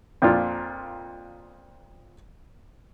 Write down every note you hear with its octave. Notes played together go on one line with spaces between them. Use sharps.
F2 A#2 D4 F4